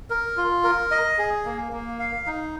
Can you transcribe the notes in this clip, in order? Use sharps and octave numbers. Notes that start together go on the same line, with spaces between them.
A#4
F4
A#4
D#5
G#4
A#3
A#3
F5
D#4